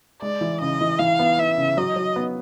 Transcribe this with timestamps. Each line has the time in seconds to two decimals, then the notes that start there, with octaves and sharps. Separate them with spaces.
0.22 G#3 D5
0.41 E3
0.61 C#3 D#5
0.81 E3
0.99 E3 F5
1.19 B3
1.38 B3 E5
1.58 C#3
1.77 F#3 D#5
1.96 F#3
2.16 B3